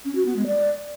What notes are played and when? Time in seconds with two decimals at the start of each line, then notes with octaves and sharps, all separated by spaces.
0.05 C#4
0.15 F#4
0.26 B3
0.36 G#3
0.47 D5